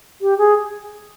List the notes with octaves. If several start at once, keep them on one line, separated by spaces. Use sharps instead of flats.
G4
G#4